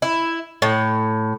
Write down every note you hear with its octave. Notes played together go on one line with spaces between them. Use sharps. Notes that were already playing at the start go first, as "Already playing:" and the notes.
E4
A2